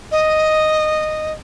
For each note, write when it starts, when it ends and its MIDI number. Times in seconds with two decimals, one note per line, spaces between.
0.11 1.33 75